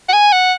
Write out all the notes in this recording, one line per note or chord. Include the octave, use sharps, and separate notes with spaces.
F#5
G#5
F#5